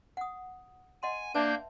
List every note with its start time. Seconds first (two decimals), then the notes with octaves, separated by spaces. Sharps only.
0.17 F#5 D#6
1.03 D#5 F#5 G#5 C6
1.35 A#3 D4 B4 E5 A5 G6